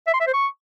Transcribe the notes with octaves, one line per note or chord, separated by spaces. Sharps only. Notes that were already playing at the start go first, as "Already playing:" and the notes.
E5
C6
E5
C5
C#6